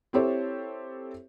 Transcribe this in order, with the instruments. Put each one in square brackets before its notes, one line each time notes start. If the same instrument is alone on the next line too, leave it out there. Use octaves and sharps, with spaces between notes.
[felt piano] C4 E4 G4 A4 C5 C#5